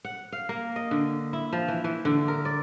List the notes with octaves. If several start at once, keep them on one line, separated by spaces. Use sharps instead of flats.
F#5
F5
A#3
D#5
D3
E4
F3
E3
E3
D3
A#4
D5